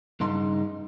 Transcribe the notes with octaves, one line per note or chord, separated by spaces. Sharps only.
G2 C#3 D#4 C6